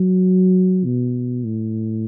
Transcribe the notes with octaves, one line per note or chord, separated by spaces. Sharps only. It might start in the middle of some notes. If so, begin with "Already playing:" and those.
Already playing: F#3
B2
A2